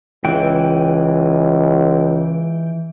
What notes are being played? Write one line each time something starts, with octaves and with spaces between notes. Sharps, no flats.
C#2 E3 G5